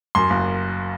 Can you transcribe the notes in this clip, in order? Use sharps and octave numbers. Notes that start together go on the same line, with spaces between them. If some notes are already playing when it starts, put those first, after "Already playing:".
F#2 C6
F#1